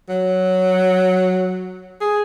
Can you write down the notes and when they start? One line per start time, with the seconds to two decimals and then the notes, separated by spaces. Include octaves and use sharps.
0.09 F#3
2.01 G#4